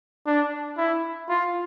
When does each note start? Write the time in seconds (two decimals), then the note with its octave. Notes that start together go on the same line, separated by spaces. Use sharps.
0.27 D4
0.77 E4
1.29 F4